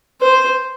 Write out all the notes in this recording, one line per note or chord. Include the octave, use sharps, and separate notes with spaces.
C5